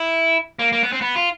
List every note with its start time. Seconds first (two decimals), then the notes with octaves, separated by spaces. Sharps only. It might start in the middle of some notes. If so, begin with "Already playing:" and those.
Already playing: E4
0.59 A#3
0.73 A#3
0.83 B3
0.92 C4
1.01 B3
1.16 F4